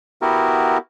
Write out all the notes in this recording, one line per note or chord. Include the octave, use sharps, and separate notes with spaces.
B3 E4 F#4 G4 A#4